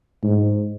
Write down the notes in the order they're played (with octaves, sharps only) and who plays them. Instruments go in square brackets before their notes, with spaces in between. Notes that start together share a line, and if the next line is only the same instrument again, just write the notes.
[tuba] G#2